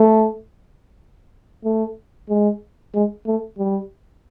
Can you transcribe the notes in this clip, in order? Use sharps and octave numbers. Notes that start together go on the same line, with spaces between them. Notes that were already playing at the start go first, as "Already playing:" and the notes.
Already playing: A3
A3
G#3
G#3
A3
G3